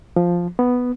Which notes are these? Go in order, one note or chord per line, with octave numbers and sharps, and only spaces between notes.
F3
B3